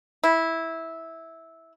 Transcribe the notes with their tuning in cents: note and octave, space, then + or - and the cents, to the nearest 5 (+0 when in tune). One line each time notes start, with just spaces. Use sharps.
E4 -10